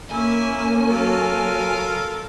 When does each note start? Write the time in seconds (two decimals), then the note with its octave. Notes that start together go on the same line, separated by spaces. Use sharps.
0.11 A#3 C#4 E4 G#5
0.89 F#3 F4 A4 A#4